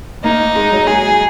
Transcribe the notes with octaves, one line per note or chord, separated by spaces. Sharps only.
A#3 D#4
G#3
F#3
G#3 G#4